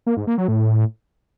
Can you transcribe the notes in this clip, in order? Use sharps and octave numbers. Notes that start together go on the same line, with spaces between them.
A#3
G#2
A#3
F#3
A2